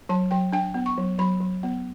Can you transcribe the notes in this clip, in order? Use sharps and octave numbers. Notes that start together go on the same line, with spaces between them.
F#3 A5
F#3 G5
D4 G5
B3
C#6
F#3
F#3 B5
F#3
B3